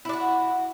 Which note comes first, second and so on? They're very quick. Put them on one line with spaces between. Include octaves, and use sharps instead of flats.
E4 D4 F#4